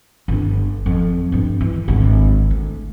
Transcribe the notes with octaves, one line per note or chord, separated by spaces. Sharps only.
G1 D4
F2
G2 C4
E3
G#1 D3
D2